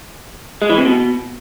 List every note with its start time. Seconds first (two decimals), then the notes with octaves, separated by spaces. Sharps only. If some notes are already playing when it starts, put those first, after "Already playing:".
0.62 G#3
0.70 E3
0.78 C3
0.86 B2